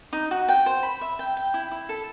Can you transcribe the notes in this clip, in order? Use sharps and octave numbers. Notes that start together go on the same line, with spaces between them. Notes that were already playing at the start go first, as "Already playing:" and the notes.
D#4
F#4
G5
C5
B5
E5
G5
G5
E4
E4
A4